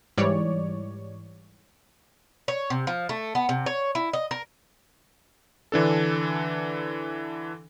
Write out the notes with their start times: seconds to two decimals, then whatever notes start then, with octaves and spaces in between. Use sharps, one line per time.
0.17 G#2 E3 G3 C#5 D5
2.48 C#5
2.70 C3
2.87 F3
3.09 A3
3.35 B3
3.49 C3
3.66 C#5
3.95 E4
4.13 D#5
4.31 A#4
5.72 D3 E3 D4 A4